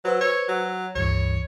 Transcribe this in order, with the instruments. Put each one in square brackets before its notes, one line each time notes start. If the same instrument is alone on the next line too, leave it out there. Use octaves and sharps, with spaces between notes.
[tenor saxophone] F#3 [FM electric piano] B4 C5 E6
[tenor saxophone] C#5
F#3
[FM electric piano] C#2 G2 E3 [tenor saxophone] C#5